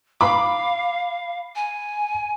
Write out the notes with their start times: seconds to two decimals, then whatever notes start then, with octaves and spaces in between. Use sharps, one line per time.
0.21 F5 B5 D6
1.55 G#5